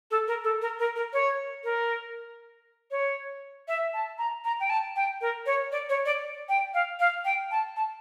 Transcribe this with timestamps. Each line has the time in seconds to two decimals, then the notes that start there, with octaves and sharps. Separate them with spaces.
0.11 A4
0.28 A#4
0.44 A4
0.62 A#4
0.79 A#4
0.96 A#4
1.13 C#5
1.64 A#4
2.91 C#5
3.68 E5
3.94 A5
4.18 A#5
4.45 A#5
4.60 G5
4.70 A5
4.96 G5
5.21 A#4
5.46 C#5
5.72 D5
5.89 C#5
6.06 D5
6.49 G5
6.74 F5
7.00 F5
7.25 G5
7.51 A5
7.76 A5